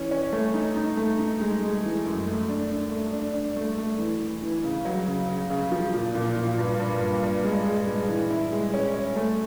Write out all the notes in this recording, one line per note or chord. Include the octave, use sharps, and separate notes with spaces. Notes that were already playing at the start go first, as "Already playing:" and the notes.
Already playing: E3 C#4
C#4
A3
D#4
D#4
A3
D#4
G#3
G#3
E3
F#2
A3
D4
D4
A3
D4
D4
A3
A3
E3
E3
E3
C#3
F#3
C#3
C#3
C#3
F3
A#2
A#2
A#2
G2
G2
G2
G2
G#3
G#3
G#3
E3
E4
G#3
C#4
C#4
A3